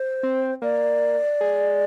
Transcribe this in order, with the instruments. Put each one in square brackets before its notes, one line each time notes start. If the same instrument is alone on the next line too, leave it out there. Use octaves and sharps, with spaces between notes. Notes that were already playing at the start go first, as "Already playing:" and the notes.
Already playing: [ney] C5
[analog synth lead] C4
[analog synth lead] A#3 [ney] D5
[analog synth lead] G#3